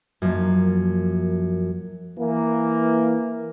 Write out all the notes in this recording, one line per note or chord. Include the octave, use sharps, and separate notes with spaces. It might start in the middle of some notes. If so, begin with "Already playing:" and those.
F#2 F3 A#3
E3 A#3